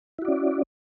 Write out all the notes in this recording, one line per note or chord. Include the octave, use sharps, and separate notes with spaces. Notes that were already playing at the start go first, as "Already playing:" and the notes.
C#4 E4 F#4 D5